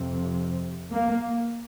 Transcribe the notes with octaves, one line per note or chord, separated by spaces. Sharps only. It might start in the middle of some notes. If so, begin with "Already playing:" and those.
Already playing: F2 C3
A#3